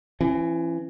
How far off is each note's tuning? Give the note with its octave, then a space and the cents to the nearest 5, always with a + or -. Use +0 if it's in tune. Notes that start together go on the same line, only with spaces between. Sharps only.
E3 +25 C#4 -40